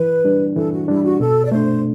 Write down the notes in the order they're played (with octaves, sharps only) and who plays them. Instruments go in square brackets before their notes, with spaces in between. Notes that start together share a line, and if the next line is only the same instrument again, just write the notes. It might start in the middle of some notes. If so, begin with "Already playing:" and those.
Already playing: [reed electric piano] E3 [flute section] B4
[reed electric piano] G3 D4
[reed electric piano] E3 [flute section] A4
[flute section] F#4
[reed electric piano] G3 D4 [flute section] E4
[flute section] F#4
[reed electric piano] B2 [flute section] A4
[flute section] D5
[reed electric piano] A3 D4 [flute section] C5